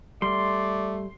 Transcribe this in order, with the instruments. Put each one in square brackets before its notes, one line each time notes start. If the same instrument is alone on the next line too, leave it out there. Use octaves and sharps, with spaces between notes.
[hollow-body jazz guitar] G3 [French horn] A3 [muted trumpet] D5 [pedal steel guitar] C6